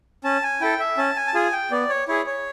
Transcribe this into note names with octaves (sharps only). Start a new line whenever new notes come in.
C#4 A5
G#5
E4 A4 G5
E5
C#4 A5
G#5
A5
F4 G#4 G#5
G5
B3 D5
C#5
E4 G#4 C#5
C#5